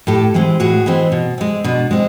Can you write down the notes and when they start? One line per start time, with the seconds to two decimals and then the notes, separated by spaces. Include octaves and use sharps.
0.07 A2 G4 A4
0.34 E3 G#3 C4
0.60 A2 F#4 G#4
0.86 E3 G#3 C4
1.12 B2
1.38 G#3 C4
1.64 B2 D4
1.91 G#3 C4